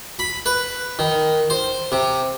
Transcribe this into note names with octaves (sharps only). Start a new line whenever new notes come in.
B5
B4
D#3
C5
C3